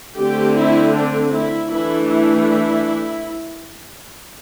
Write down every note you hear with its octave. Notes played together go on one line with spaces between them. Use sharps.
D3 A3 C4 G4
E4
D4
E4
E3 A3 D4 E4
E4